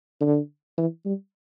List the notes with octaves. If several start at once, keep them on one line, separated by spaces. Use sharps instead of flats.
D3
E3
G3